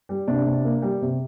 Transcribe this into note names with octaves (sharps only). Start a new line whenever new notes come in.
G3
C3 D4
C3
A#3
G3
C3